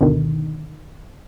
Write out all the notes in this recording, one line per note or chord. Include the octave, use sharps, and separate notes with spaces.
G#1 D2 B2 D3 D#3